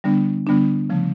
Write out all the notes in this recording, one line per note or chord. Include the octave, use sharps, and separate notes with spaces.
D3 G3 B3 D4
D3 G3 B3 D4
C#3 F3 A3